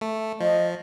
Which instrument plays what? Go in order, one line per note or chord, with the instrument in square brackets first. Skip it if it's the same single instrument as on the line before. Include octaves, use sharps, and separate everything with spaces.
[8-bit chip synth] A3
[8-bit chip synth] F3 [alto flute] D#5